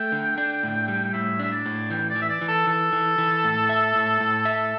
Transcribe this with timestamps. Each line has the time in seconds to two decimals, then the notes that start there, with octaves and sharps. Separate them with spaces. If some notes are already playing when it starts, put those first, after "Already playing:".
Already playing: A3 G5
0.12 D3
0.38 D4
0.63 A2
0.88 G3
1.14 A2 E5
1.39 D4 E5
1.52 D5
1.66 A2
1.90 E3 G5
2.10 D5
2.16 E3
2.22 E5
2.29 D5
2.41 E3
2.48 A4
2.67 E3 A4
2.93 E3
3.18 E3
3.44 A2
3.69 E5
3.95 A2
4.20 A2
4.45 E5